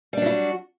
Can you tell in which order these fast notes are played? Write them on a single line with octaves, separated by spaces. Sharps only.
G3 D4 F#3 E4 F#4